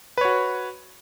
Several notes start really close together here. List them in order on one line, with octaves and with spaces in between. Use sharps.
B4 C#5 F#4